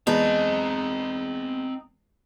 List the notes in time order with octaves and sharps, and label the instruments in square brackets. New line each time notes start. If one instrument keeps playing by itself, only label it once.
[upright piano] E2 G#3 B3 [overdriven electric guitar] C4 A5 [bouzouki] D#4